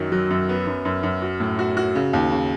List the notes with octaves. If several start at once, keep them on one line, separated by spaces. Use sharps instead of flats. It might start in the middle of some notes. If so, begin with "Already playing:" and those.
Already playing: F#2 D#3 F#3
F#3
F#2
B3
F#2
F#2
F#2
F#4
A2
F#4
F#4
C#3
D#2
C#3